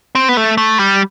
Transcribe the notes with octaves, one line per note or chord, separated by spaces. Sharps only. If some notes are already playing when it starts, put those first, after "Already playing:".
C4
B3
A3
A3
G3